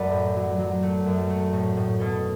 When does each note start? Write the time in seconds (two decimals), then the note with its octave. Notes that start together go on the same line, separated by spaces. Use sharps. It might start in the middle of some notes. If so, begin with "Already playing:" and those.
Already playing: F#2 F#3 A3 F#4 A4 B4 D5
0.12 A2
0.36 F#3
0.59 F#3
0.83 A3
1.06 F#2
1.30 A3
1.53 A2
1.77 A2
2.00 B2 A4